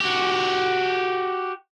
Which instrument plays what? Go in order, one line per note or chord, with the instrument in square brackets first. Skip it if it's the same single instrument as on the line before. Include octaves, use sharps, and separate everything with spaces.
[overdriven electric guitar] F#4 G4